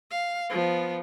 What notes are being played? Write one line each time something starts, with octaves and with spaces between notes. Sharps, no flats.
F5
F3 B3